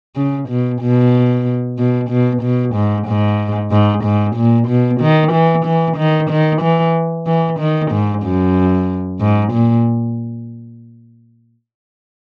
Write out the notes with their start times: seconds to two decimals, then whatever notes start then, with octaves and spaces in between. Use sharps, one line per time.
0.16 C#3
0.49 B2
0.82 B2
1.78 B2
2.10 B2
2.42 B2
2.75 G#2
3.08 G#2
3.71 G#2
4.04 G#2
4.36 A#2
4.68 B2
5.01 D#3
5.32 E3
5.66 E3
5.98 D#3
6.30 D#3
6.62 E3
7.27 E3
7.59 D#3
7.92 G#2
8.23 F#2
9.21 G#2
9.53 A#2